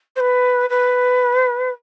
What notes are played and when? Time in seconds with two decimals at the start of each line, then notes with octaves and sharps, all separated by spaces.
0.16 C5
0.20 B4
0.70 B4